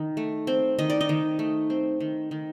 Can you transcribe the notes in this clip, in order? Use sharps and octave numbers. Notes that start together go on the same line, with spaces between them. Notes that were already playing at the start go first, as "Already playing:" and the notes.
Already playing: D#3 D#4
A3
C4
D#3 D#5
D5
D#4 D#5
D#3
A3
C4
D#3
D#3